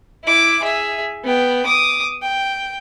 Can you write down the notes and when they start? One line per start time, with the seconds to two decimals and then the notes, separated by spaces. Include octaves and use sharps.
0.24 E4 D6
0.62 G#4 E5
1.24 B3 G5
1.66 D6 D#6
2.22 G5